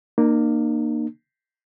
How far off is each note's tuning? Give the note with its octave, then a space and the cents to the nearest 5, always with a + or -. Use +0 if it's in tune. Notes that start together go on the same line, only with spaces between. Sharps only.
A#3 +0 D#4 -45